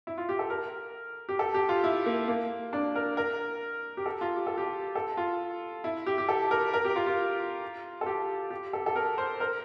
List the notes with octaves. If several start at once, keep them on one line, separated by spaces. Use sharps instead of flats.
E4
F4
G4
A4
A#4
G4
A4
G4
F4
E4
A#3
A#3
D4
A#4
A#4
G4
A4
F4
G4
A4
G4
A4
F4
E4
G4
G4
A4
A#4
A#4
G4
F4
F4
A4
G4
G4
A4
A4
A#4
C5
A#4